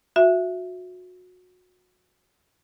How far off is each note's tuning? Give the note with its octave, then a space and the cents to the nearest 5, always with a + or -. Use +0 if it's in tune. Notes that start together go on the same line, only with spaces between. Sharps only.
F#4 -25 E5 +10